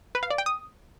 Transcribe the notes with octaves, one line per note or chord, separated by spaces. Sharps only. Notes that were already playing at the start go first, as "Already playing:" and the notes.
B4
F5
D5
G5
D#6